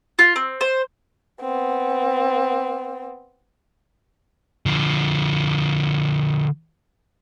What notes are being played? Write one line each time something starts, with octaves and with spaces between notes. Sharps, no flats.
F4
C4
C5
B3 C4
D3 F3